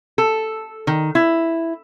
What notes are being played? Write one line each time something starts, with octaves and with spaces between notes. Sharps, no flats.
A4
D#3
E4